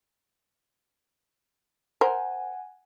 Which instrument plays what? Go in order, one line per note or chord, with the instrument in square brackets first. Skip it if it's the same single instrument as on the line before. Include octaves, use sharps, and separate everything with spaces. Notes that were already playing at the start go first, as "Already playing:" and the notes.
[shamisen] A#4 C5 [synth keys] F#5 G#5